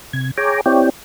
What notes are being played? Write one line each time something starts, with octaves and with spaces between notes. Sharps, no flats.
C3 G#6
G#4 C#5 G5 G#5 A#5 D6
C4 E4 G4 C#5 D5 G5